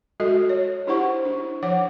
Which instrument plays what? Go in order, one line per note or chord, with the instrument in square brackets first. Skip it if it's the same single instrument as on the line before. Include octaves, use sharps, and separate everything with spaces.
[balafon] G#3 F#4 A4 D#5 E5
C#5
D4 E4 G4 C5 F#5 C#6
D4
F3 C#5 F#5 D6